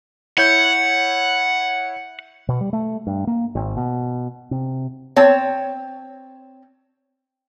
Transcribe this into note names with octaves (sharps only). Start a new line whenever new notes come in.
E4 C#5 F#5 G6
B2
G3
A3
G2
A#3
G#1
B2
C3
C4 C#5 A5